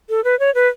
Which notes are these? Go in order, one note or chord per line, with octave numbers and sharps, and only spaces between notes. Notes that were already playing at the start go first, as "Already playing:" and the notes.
A4
B4
C#5
B4